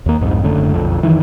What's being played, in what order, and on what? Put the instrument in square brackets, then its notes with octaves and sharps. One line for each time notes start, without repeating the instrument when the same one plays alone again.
[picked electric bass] D#2 A#3
C2 F2 G#2
F#1 F#2 D3 A3
B1 F2
F#2 C3 D#3 E3